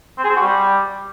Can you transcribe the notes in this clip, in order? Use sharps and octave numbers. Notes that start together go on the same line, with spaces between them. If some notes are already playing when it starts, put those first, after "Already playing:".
C4
G#4
C4
F#4
G3